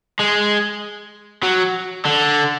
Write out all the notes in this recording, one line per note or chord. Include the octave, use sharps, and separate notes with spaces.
G#3
F#3
D3